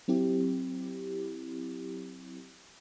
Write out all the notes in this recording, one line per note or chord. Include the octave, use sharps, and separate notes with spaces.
F#3 C4 E4 G4